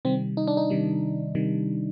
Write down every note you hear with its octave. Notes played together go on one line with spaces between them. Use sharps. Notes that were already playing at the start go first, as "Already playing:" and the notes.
C3 D#3 G3 C4
D#4
D4
D#4
C3 D#3 G3
C3 D#3 G3